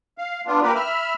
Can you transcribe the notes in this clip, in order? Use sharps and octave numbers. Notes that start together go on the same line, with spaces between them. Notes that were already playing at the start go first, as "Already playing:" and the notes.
F5
B3 D4 F4
A#3 G4 A#4 B4
E5 B5 F6